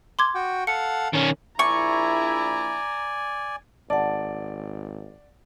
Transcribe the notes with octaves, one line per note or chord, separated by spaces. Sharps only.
C6 D6 G#6
F#4 G5
A4 F5 F#5 C#7
D#3 C#4
A#1 E4 D5 G#5 A#5 C#6
G#1 D5 F#5 A5